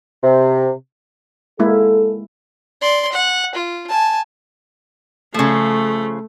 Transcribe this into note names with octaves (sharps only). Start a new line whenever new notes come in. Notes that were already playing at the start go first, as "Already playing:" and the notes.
C3
G#3 A#3 E4 A4
D5 C6
F#5
F4
G#5 A5
C#3 F3 A3